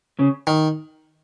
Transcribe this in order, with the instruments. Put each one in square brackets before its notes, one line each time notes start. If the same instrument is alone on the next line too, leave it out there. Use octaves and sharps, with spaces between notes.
[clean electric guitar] C#3
[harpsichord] D#3